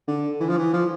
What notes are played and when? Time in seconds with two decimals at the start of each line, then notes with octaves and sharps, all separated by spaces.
0.08 D3
0.40 E3
0.49 F3
0.57 E3
0.73 F3